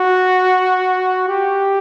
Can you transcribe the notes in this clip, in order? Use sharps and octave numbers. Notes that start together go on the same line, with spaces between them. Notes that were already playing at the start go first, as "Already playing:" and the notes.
Already playing: F#4
G4